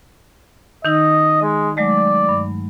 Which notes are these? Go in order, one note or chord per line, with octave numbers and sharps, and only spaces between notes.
D#3 D#4 D#5 E6
G#3
F#3 G#3 A3 D5
G2